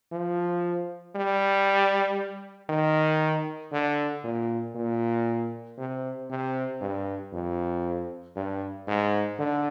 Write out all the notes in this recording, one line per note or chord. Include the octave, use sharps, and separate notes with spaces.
F3
G3
D#3
D3
A#2
A#2
C3
C3
G2
F2
G2
G#2
D3